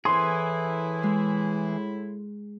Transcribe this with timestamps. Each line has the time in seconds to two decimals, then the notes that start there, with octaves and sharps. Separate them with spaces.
0.05 A2 E3 E4 G#4 C5 C6
1.03 G#3